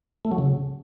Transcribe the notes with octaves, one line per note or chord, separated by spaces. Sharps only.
A3
F#3
C#3